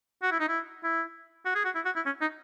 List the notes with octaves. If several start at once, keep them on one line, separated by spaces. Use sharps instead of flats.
F#4
E4
D#4
E4
E4
F#4
G#4
F#4
E4
F#4
E4
C#4
D#4